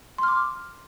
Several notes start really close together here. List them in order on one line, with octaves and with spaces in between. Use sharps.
C6 F6 D6